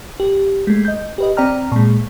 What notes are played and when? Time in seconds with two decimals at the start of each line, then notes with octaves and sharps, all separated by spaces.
0.20 G4
0.67 G#3 A3
0.85 D#5 G6
1.18 G4 B4 D#5
1.37 C4 D5 G5 A#5 F6
1.72 A#2 G#3